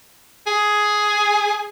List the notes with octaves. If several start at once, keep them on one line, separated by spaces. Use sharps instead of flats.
G#4